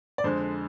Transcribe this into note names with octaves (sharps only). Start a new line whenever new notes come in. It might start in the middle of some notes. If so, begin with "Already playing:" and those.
D5
F2 D3 G#3 C5